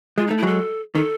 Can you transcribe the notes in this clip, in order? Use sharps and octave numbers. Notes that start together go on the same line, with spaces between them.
G#3 F4
D#4
A3
E4
F#3 G#3 A4
D#3 A4